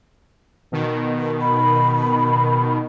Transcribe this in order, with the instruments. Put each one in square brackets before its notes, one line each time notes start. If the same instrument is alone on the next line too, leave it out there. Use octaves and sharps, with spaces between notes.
[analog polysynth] B2 D#3
[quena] B5